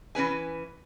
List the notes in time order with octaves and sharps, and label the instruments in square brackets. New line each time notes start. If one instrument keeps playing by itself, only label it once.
[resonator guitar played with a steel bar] E3 C#4 B4 G#5